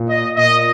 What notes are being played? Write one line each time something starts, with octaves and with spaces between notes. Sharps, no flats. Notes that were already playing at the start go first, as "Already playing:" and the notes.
Already playing: A#2
D#5
A#2 D#5